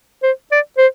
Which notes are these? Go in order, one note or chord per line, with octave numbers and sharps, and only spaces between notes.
C5
D5
C5